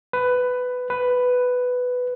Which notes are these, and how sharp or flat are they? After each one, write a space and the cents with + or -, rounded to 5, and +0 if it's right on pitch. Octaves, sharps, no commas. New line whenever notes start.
B4 +15
B4 +10